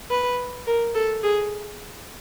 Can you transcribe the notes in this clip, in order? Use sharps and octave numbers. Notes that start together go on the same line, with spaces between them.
B4
A#4
A4
G#4